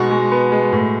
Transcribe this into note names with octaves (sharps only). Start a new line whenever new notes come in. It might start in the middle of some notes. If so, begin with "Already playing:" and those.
Already playing: B2 G#3 D#4 F#4
G#3
B3
G#3
A2